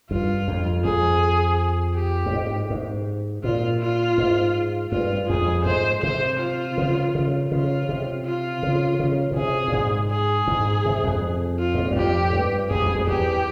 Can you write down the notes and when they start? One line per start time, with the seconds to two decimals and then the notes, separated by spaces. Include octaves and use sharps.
0.10 G2 F4
0.48 F2
0.85 F2 G#4
1.95 G4
2.26 G2
2.33 G#2
2.70 G#2
3.44 A#2 F4
3.81 F4
4.18 G#2
4.92 G2 F4
5.30 F2 G#4
5.66 G#2 C5
6.03 C3 C5
6.40 F4
6.78 C#3
7.15 C#3
7.51 C#3 F4
7.89 C3
8.26 F4
8.63 C#3
8.99 C#3
9.32 A#2
9.36 C3 G#4
9.68 A#2
9.74 G#2
10.11 G#4
10.47 G#2
10.85 C3
11.04 F2
11.60 F4
11.75 G#2
11.86 G2
11.96 F2 G4
12.33 G2
12.71 F2 G#4
12.82 F2
12.95 F2
13.07 E2 G4